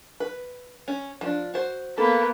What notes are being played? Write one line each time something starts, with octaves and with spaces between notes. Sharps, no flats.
B4
C#4
F3 D4
F#4 C5
A#3 B3 A4